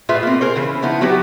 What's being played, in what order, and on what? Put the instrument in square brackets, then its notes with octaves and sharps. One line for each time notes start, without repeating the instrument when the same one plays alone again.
[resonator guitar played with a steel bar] A2 F4 G#4 B4 E5
A#3 C4
G#4 A#4 C5
C#3 E3
F3 B3 D#4 E4
F#3 B3 F#4 G4